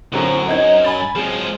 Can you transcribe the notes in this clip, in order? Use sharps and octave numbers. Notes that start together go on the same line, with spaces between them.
F#2 A2 D3 F3 F#3 A#3 C4
C4 D#4 D#5 G#6
G#5 B5 A6
F3 F#3 G#3 C4 G#4